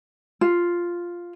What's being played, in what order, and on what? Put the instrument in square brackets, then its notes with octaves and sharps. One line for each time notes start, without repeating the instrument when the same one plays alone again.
[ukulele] F4